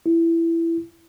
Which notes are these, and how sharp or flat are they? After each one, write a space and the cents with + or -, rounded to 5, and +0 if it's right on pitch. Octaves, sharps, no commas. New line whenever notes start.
E4 +15